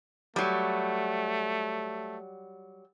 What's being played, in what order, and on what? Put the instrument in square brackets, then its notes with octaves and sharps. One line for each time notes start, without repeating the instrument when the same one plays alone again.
[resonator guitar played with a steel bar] F#3 G3 [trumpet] A3